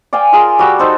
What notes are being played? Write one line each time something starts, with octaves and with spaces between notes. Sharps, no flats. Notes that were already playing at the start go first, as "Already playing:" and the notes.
D5 F5 G5 G#5
F4 G#4 A#4 C6
G3 F#4 B5 E6
D#4 A4 C5